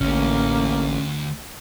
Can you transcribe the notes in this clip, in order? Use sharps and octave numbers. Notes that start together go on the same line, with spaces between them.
A1 D2 A#3 C#4